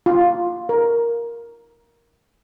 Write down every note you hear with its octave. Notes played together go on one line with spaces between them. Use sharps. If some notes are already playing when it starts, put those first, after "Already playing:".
F4
A#4